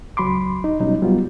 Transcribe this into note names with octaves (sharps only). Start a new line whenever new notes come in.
C#2 F#3 B5 C6 D6
D#4
B2 F#3 G3 C#4 D#4
F#3 G3 B3 F4